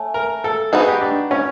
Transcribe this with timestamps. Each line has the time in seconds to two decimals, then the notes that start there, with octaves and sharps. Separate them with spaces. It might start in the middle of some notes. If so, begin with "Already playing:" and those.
Already playing: A3 C#4
0.14 A#4
0.44 A4
0.72 B3 D#4 F#4 G#4
0.88 G4
1.01 D4
1.31 C#4